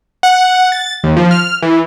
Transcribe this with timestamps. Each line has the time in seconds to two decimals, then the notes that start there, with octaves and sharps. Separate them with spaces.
0.23 F#5
0.72 A6
1.04 D#2
1.17 F3
1.31 F6
1.62 E3